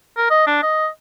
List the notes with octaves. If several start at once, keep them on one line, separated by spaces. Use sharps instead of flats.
A#4
D#5
D4
D#5